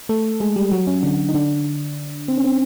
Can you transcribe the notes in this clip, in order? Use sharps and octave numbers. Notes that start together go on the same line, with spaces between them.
A3 A4
G#3 G#4
G3 G4
F#3 F#4
C#4
D3 D4
D#4
D3 D4
C4
C#4
C4